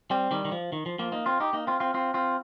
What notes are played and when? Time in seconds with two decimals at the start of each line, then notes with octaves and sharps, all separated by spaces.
0.11 G3 C4
0.31 D#3 G3
0.45 D#3
0.52 F3
0.72 D#3
0.86 F3
0.99 F3 A#3
1.12 A#3 D#4
1.26 C4 F4
1.40 D#4 G4
1.53 A#3 D#4
1.67 C4 F4
1.80 C4 F4
1.94 C4 F4
2.14 C4 F4